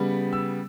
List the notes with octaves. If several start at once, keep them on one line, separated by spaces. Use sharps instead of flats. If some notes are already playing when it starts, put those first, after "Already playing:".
Already playing: C#3 G3 B3
E6